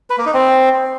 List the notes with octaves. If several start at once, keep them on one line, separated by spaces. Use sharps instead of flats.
B4
A#3
D#4
C4